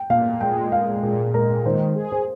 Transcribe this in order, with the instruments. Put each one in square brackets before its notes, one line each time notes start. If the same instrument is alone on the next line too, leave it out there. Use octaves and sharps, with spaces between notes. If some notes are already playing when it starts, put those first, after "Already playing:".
Already playing: [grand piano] G5
[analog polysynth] A#2 [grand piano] F5
[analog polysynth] G#3 [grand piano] G5
[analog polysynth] A#2 [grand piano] F5
[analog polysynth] A#2 [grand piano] G#4
[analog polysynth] G#3 [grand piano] A#4
[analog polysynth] D#3 [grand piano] C5
[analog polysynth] G#4
[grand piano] C5